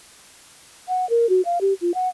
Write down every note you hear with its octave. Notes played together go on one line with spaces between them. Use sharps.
F#5
A#4
F#4
F5
G4
F4
F#5